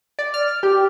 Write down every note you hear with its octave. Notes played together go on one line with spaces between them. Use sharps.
D5
F6
G4